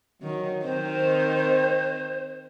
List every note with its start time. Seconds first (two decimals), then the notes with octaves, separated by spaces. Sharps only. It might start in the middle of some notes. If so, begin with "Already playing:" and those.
0.22 D#3 F#3
0.64 D#3 C4 C5